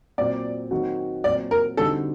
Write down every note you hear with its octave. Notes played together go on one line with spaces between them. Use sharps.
A#2 F#3 C4 D5
D#3 F#3 C4 F#4
A#2 F#3 C4 D5
A#4
D3 G3 C4 D#4 F#4 A4